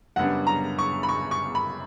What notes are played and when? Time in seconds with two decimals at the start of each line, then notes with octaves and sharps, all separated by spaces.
0.16 F#2 C#3 G3 B3 D4 F#5
0.47 A#5
0.79 C#6
1.03 B5
1.09 C#6
1.31 C#6
1.55 B5